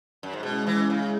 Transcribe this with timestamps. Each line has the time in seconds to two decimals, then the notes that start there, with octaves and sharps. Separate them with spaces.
0.23 F#2
0.33 G#2
0.42 B2 G#3 C#4 E4
0.67 E3
0.90 C#3